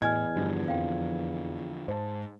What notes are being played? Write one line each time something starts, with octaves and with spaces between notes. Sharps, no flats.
E2 A2 D#5 G#5 F6 G#6
G2 D3 F3
F2 F5 G5
G#2 C5 A5